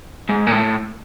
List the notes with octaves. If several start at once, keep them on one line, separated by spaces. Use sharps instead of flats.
G#2
A#2
A2